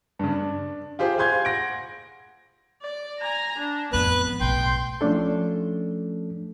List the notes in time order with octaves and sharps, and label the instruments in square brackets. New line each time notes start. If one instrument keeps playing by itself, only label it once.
[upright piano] G2 C#3
D4
F4 G4 G#4 C5
G#4 F5 G#5 C6 G6 G#6
F#5 A#6 D7
[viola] D5
G#5 A#5
D4
[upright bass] A1 F2 [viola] B3 [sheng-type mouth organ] B4 F#6
[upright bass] B1 A2 [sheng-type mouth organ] G5 [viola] C6
[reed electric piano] F3 A3 C#4 D4 A4